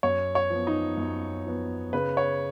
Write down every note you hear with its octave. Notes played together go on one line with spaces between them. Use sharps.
F#2 C#5
C#5
F3 B3
D#4
F#2
F3 B3
C#3 B4
C#5